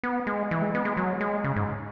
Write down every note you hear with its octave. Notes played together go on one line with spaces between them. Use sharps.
B3
G#3
E3
G#3
B3
G#3
F#3
G#3
C#3
G#2